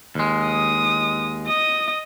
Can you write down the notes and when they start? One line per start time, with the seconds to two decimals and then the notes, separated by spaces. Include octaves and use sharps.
0.15 D#2 G#3
0.47 D#6
1.47 D#5 D#6